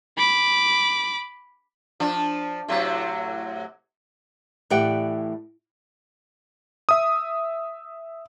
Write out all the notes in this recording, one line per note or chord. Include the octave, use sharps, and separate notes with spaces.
B5 D6
F3 D4
A2 C3 F#3
A2 E3 G4 D5 F#5 G5
E5 D#6